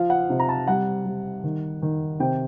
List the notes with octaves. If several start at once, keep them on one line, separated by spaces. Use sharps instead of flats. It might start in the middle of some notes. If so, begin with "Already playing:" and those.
Already playing: F3 F5
F#5
C3
A#5
A5
G3 F#5
G3
D#3
D#3
C3 G5